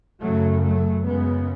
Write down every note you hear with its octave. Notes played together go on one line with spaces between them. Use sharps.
F#2 C#3 F#3 A3
F#3 A3
F#2 C#3 G#3 B3